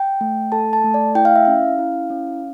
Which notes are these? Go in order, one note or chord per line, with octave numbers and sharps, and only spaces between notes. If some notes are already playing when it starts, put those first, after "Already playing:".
Already playing: G5
A3
A4 A5
A5
A3
D5
E4 G5
F5
E5
C#4 F5
E4
C#4